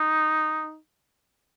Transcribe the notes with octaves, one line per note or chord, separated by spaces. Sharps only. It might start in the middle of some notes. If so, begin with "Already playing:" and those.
Already playing: D#4